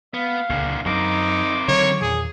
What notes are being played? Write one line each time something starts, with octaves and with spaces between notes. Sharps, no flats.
B3 F5
C#2 A#2 D3
F#2 C4 D#4 A#4 D6
D3 D#3 F#3 C#5
E2 A#2 G#4